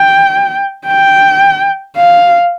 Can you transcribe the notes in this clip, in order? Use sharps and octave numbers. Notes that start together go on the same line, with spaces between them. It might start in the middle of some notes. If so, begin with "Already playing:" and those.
Already playing: G5
G5
F5